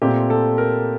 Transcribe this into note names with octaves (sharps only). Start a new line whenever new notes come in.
A#2 A3 C4 G4
A4
A#4